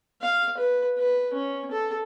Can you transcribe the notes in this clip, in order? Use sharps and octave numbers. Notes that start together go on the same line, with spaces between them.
F5
B4
B4
C#4
A4